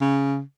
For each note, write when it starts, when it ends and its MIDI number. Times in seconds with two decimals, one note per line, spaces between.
0.01 0.42 49